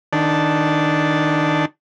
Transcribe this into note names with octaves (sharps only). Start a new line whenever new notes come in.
D#3 D4 A5